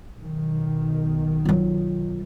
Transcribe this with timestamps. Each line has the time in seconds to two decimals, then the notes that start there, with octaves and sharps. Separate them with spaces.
0.18 B1 D#3
1.45 F#3 F4